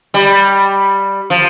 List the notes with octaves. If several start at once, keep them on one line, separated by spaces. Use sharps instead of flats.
G3
F3